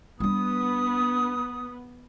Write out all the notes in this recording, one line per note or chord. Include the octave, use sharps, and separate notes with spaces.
G3 B3 D4 D#6